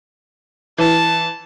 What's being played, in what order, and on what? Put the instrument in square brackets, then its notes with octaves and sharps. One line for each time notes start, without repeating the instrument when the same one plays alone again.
[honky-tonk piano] E3 [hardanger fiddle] A5